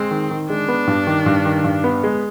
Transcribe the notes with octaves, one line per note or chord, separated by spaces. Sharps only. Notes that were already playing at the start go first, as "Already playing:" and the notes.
Already playing: G#3 C4
D#3
D#3
G#3 D4
B3
G2
D#3
G2
D#3
G2
B3
G#3